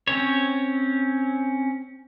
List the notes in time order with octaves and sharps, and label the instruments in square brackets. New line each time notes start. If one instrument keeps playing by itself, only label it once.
[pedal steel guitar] C4 C#4 C#5